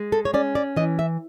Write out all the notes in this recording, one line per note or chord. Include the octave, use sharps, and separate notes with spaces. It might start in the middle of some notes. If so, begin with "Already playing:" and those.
Already playing: G#3
A4
C#5
C#4 D5
D5
E3 D#5
E5